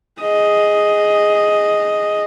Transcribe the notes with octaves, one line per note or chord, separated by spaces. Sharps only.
G#4 D#5